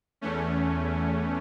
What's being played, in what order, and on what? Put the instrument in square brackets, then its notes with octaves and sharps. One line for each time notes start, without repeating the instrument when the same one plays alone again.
[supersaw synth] E2 E3 A3 C#4